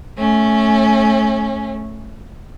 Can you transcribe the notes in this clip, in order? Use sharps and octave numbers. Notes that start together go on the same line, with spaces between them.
A3 C#4